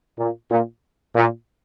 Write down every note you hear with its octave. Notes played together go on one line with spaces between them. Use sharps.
A#2
A#2
A#2